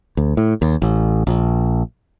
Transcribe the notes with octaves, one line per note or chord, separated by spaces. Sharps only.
D2
A2
D#2
A1
A#1